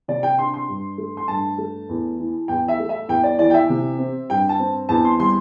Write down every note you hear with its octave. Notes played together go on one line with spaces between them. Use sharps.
C3 D5
G5
D4 C6
C6
G2
A3
C6
G2 A5
A3
E2
E3
E2 G5
E5
A3
E5
E2 G5
D5
E3 D5
G5
E5
C3
C4
G2 G5
A5
C4
E2 A5
C6
G3 C6